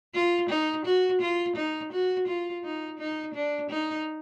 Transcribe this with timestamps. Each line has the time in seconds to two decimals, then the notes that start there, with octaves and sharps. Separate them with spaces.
0.14 F4
0.49 D#4
0.85 F#4
1.21 F4
1.56 D#4
1.92 F#4
2.27 F4
2.64 D#4
2.99 D#4
3.34 D4
3.70 D#4